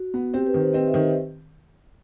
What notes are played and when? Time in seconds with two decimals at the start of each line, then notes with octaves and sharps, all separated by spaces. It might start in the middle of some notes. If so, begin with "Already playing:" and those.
Already playing: F#4
0.14 B3
0.34 C4 G4
0.47 B4
0.54 D#3
0.61 C5
0.73 C4 D#5
0.87 E5
0.94 D#3
1.00 D#5